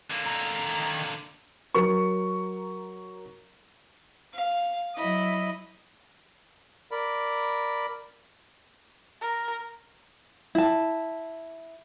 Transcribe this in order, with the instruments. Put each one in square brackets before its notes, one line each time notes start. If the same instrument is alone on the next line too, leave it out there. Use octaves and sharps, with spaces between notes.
[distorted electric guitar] D3 A#3
[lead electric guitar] D#3 A#5
[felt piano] F#3 A#4 C#6
[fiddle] F5
[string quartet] F#3 E4 [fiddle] D#5
[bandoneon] A#4 D5 B5
[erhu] A#4
[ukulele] E4 A5